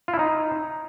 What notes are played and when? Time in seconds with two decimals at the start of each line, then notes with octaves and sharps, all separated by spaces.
0.08 F4
0.14 E4
0.19 D#4